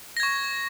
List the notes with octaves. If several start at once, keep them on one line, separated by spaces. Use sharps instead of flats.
C#6 G#6 A#6